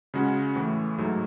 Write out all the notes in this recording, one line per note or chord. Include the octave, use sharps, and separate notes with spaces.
C#3 G#3 C#4 F#4
A2 E3 A3
G#2 F#3 A3